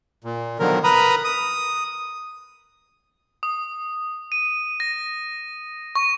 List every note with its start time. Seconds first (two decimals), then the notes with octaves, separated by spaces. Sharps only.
0.24 A#2
0.59 B2 D3 D#3 F3 F#3 A#4
0.84 A#4 B4 A#5 B5 D#6
1.24 D#6
3.43 D#6
4.32 D#7
4.80 A#6
5.95 C#6